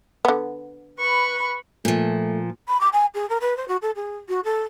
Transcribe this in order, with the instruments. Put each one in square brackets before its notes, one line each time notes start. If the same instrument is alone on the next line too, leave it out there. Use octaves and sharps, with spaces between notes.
[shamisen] D3 B3
[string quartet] B4 B5 C#6
[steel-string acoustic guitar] A#2 F3 [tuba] A3
[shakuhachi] B5
D6
G#5
G#4
A#4
B4
C5
F#4
A4
G#4
F#4
A4